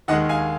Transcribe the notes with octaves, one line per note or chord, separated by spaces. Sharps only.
D#2 D#3 G#3 D#5 F#5
F5 G#5